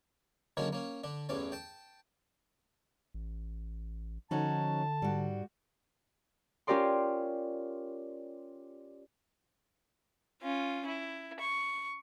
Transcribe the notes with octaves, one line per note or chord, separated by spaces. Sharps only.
D3 D#3 F#3 G#3 A#3 C#4
A#3 C#4
D3 D4
A1 E2 A2 C#4 D5
G5 A5
A1
D3 F3 C#4 D#4 F#4 A5
G#2 G3 F#4
C#4 F4 G4 A#4 D5 C6
C#4 F4
E4
C#6